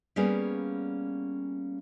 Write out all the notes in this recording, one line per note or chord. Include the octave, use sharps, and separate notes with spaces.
G3 A#3 B3 C#4 G#4